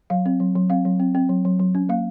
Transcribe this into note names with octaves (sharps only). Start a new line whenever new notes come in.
F#3 F5
C4
F#3
F#3
C4 F5
F#3
C4
C4
F#3
F#3
F#3
C#4
A#3 F5